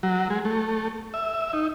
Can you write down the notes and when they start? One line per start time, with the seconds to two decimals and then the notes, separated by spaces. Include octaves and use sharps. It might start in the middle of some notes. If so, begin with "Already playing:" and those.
0.03 F#3
0.30 G#3
0.45 A3
1.14 E5
1.53 D#4